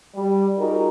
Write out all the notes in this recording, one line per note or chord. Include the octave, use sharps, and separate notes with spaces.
G3
D#4 F4 F#4 G#4 A#4